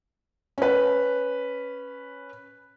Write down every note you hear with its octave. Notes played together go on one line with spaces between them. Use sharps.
C#4 B4